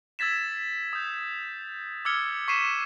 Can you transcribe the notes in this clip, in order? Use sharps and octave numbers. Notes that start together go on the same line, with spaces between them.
E6 G#6 A6 B6 E7
D#6 G6
D6 E6 F6 G#6 C#7 G7
C#6 B6 C7 D#7 E7